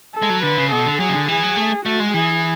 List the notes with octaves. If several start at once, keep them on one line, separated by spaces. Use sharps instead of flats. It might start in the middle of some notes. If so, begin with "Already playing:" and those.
A4
G#3
F#3
D3 B4
C#3
B2 A4
D3
F#3 G#4
C#3
D3
E3 G#4
F#3
A3
A3 F#4
G#3
E3 G#4